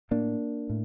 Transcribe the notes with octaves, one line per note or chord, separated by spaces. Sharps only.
A2 A#3 D4
A2